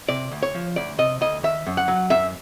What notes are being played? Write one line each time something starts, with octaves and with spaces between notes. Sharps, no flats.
C3 D5
D2
C#5
F3
D2 D5
C3 D#5
D2 D#5
D#3 E5
F#2
F#5
F#3
F#2 E5